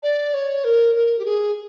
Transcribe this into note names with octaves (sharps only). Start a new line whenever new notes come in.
D5
C#5
A#4
A#4
G4
G#4